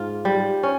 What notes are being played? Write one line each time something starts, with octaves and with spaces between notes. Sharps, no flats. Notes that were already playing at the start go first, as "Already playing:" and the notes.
Already playing: G#2 F4
G3
C#4